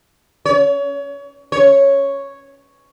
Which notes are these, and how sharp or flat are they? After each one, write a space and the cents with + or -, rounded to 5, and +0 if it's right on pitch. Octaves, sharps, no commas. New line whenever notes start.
C#5 +30
C#5 +0